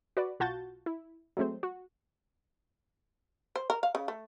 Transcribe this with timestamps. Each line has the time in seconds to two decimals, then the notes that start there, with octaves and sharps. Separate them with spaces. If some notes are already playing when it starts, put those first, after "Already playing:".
0.17 F#4 B4 D5
0.40 B1 F4 F#4 A5 G6 A6
0.86 E4
1.37 F#3 G#3 A3 C4 C5
1.63 F#4
3.56 C5
3.70 A#4
3.83 F5
3.95 C#3
4.08 A3